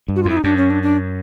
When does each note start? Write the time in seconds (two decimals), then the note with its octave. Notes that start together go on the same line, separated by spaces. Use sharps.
0.08 G2
0.16 F#4
0.23 F4
0.25 F2 E4
0.37 D#4
0.44 F#2 D4
0.57 C#4
0.70 D4
0.83 D4